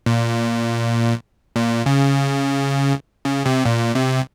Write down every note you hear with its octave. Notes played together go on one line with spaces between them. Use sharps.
A#2
A#2
C#3
C#3
C3
A#2
C3